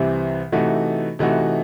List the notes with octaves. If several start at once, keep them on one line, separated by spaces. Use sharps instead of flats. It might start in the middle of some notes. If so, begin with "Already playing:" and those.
Already playing: C2 C3 E3 C4
C3 E3 A3 D#4 F#4
C3 E3 A3 D#4 F#4